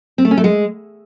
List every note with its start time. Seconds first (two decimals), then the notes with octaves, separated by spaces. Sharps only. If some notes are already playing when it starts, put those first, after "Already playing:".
0.18 C4
0.25 A3
0.31 C#4
0.37 A3
0.44 G#3